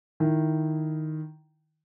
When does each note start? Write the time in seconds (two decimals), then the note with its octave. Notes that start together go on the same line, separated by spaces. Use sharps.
0.20 D#3 E4